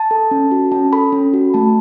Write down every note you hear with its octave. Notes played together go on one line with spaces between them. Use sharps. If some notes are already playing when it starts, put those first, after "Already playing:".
Already playing: A5
A4
C#4
F#4
C#4 A5
A4 B5
C#4
F#4
A3 A5